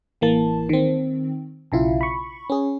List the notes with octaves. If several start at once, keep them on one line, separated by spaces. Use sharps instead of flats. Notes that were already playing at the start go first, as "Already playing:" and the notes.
A1 E3 A#3 A5
D#3 C4
B1 C#3 E4 F4
B5 C#6
C#4 G#4